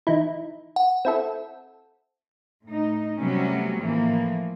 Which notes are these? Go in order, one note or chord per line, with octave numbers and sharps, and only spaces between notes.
E3 D#4 E4
F#5
C4 E4 A4
A2 D#4
C3 F#3 G3 A3 B3 C#4
A2 E3 F3 A#3